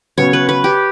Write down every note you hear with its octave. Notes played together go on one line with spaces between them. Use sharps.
C#3 F#3 B3 C#5
B4
B4
G4